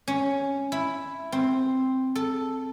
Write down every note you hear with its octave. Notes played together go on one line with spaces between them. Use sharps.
C#4
E4
C4
A4